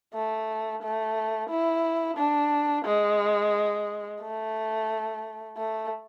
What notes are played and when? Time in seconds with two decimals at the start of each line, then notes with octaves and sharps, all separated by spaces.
0.14 A3
0.82 A3
1.50 E4
2.17 D4
2.85 G#3
4.22 A3
5.57 A3